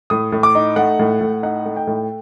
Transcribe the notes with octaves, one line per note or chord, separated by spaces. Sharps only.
A2 D#6
A2
D6
D#4
A3 F#5
A2
A2
D#4 F#5
A3
G5
A2